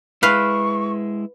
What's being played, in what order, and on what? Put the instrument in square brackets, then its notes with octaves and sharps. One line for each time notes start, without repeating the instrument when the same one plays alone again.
[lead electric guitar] G#3 E4 [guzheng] B4 F5 [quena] C#6